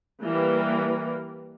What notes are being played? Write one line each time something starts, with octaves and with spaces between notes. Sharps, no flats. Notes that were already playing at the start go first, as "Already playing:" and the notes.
E3 G3 A#3